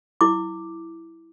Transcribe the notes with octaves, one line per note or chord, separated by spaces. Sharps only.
E4 D6